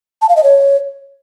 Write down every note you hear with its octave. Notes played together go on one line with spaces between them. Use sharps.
A5
F5
D#5
C#5